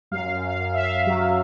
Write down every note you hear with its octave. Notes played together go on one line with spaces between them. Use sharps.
F#2 F5
F#2
F5
F#2
E5
F#2 F5
F#3